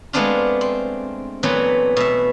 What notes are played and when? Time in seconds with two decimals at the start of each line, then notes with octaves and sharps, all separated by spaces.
0.13 G#3 A3 B3 C4 D4 F4
0.61 C4
1.43 A#2 E3 F#3 A3 B3 C4
1.96 B2 E5